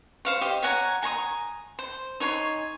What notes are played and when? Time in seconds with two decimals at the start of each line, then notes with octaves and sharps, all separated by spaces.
0.25 C5 F5 C#6
0.41 G4 D#5
0.62 C#5 F#5 G#5 A#5
1.02 G#5 A#5 C6 D#6
1.79 C5
2.20 D#4 C#5 G#5 C6